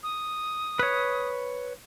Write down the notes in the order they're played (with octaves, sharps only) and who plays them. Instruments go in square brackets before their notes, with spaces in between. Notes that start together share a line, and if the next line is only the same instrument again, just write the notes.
[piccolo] D#6
[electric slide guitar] B4 C#5